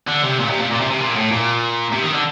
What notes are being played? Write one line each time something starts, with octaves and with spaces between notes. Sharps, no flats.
D3
C3
A#2
C3
A#2
A#2
C3
C3
A#2
A2
A#2
C3
D#3
D3